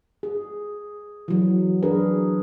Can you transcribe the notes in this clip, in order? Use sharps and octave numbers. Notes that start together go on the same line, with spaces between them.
G#4
E3 F#3
F#3 D4 G#4 A#4 B4